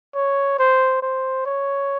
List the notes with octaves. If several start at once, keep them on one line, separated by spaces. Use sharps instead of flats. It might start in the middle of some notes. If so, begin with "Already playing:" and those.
C#5
C5
C5
C#5